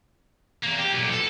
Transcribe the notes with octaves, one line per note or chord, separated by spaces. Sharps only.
E2 A#3
G4
B1 A#2
A4